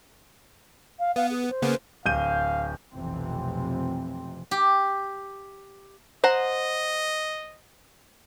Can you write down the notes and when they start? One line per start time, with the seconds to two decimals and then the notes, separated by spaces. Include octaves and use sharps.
0.99 F5
1.16 B3 F5
1.30 G#4
1.50 C5
1.62 C#3 A#3 B3
2.06 D1 F5 G6 D#7
2.93 F1 B1 F2 C3 E3 C4
4.51 G4
6.24 C5 D#5 F#5 A#5